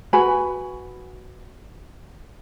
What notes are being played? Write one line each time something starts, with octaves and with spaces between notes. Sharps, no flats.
F#4 B4 G#5 B5